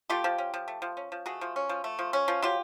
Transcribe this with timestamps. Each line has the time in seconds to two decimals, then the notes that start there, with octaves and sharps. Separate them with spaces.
0.10 A3 F4 G4
0.24 F3
0.38 C#4
0.54 F3
0.68 A3
0.82 F3
0.97 C#4
1.12 F3
1.26 A3 F#4 G#4
1.41 F3
1.56 C#4
1.69 F3
1.84 A3
1.99 F3
2.13 C#4
2.28 F3
2.42 F#3 F4 G4